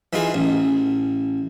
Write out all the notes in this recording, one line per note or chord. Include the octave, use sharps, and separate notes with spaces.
E3 D#4 F4 G#4
A1